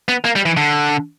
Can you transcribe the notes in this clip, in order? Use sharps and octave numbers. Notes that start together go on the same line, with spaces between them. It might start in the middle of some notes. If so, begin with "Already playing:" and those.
B3
A#3
G3
E3
D3